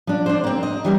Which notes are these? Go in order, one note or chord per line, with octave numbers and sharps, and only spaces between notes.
F3 D4
D4 C5
A#3 C4
D#5
E3 G3 A#4